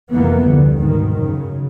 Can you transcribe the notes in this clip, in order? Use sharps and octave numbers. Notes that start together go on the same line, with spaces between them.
F1 C2 F2 E3 A#3 B3
D2 D3 G3
G#2 B2 D#3
F#2 C#3